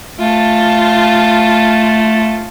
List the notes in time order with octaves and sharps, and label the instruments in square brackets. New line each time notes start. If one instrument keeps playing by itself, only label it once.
[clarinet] A3 [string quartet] F4 A5